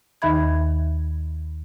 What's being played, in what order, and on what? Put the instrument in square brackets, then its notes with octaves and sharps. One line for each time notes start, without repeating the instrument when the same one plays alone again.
[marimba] D#2 D#3 D#4 E5 B5 G#6